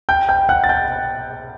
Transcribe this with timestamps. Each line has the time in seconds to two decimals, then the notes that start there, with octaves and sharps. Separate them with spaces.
0.09 G5 G6
0.29 G5 G6
0.49 F#5 F#6
0.64 A6
0.69 G5 G6